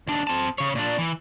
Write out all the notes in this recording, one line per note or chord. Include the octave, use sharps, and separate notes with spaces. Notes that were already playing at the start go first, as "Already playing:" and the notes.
D#2 D4
C4 A5
C#3 C#5
A#2 D4
E3